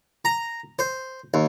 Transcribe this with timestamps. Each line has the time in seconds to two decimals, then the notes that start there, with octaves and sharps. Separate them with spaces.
0.25 A#5
0.79 C5
1.34 D#2